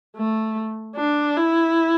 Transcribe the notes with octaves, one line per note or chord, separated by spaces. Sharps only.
A3
D4
E4